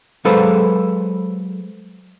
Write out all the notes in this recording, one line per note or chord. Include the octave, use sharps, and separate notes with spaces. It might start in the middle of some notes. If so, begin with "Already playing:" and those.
F#3 G#3 A4 B4 C5 F5